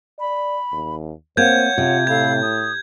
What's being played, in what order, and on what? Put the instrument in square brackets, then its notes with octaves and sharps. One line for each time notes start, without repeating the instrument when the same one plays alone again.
[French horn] D5 [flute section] B5
[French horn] D#2
[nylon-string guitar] A#3 C4 [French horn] C5 [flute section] C#5 F#5 [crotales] G6 G#6
[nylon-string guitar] C3 [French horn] F4
[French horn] A2 [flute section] A4 F5 B5 [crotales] G#6
[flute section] D#6